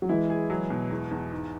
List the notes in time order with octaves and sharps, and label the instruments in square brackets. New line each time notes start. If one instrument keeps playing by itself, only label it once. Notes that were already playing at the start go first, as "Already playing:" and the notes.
[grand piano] F#3
[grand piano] E3 G#3 [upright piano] E4
[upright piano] G#4
F#3
B2
E2
E2
G#2